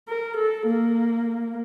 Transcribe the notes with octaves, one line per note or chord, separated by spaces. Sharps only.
A#4
A4
A#3